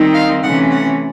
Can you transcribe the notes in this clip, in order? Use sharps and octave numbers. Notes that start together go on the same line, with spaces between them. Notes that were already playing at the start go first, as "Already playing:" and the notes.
Already playing: D#3 G3 C4 D#4
F5
C3 E3 A3 C#4 F#5
F#5